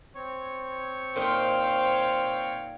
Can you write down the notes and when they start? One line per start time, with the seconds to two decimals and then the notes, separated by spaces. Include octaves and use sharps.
0.15 C4 C#5 C#6
1.16 A#2 D#4 C5 F5 G5 C6